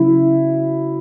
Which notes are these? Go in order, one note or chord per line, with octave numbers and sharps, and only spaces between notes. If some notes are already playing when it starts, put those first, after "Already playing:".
Already playing: C#3 F#3 E4